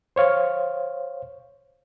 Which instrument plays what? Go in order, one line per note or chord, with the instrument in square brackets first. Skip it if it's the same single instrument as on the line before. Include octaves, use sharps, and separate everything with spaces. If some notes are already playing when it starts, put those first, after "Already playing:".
[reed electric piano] C5 C#5 F5